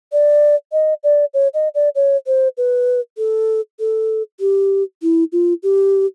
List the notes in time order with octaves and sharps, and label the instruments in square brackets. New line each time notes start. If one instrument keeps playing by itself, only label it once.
[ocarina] D5
D#5
D5
C#5
D#5
D5
C#5
C5
B4
A4
A4
G4
E4
F4
G4